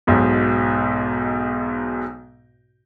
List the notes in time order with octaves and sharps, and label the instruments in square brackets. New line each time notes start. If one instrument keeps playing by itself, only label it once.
[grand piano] B1 G#2 B2